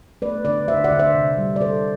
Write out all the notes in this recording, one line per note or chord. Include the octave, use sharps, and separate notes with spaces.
A3 B4 D5
D3 B4 D5
D3 C5 E5
D5 F#5
D3
C5 E5
C3
G3
D5
G3 A4 C5